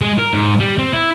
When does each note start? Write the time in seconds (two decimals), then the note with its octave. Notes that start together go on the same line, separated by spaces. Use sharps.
0.01 G#3
0.19 A#4
0.33 G#2
0.60 G3
0.78 C4
0.93 E4